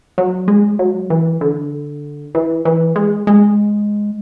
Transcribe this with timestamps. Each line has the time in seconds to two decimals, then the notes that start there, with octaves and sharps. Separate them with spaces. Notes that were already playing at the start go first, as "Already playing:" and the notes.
0.18 F#3
0.48 G#3
0.79 F#3
1.10 E3
1.41 D3
2.35 E3
2.65 E3
2.96 G#3
3.27 G#3